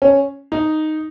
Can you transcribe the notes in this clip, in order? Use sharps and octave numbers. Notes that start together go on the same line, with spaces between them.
C#4
D#4